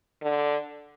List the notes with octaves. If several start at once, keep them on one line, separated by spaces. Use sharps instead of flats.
D3